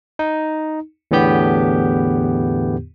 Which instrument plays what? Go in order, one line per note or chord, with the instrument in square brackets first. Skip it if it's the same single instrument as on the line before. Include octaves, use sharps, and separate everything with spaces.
[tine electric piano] D#4
E2 A2 D3 B3 G4 G6